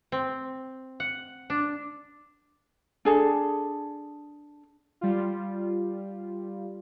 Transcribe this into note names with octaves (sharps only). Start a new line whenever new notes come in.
C4
F#5
D4
D4 G#4 A4
G3 F4